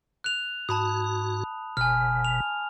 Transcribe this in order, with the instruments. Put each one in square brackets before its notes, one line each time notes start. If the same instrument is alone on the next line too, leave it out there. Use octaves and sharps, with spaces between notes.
[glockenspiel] F#6 F7
[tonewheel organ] G#2 F#4 [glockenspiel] A5 B5 D#6
[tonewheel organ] F#1 B2 [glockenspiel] G#5 F6
[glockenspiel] F7